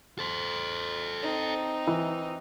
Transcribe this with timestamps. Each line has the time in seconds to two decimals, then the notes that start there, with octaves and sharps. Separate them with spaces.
0.19 A4 C5
1.22 C4 D#4
1.87 E3